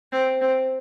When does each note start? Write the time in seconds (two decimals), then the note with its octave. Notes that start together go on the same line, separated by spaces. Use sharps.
0.12 C4
0.41 C4